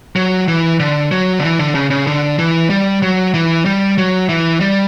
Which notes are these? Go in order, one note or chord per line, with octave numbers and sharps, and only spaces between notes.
F#3
E3
D3
F#3
D3
E3
D3
C#3
C#3
D3
E3
G3
F#3
E3
G3
F#3
E3
G3